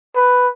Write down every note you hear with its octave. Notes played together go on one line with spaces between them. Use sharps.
B4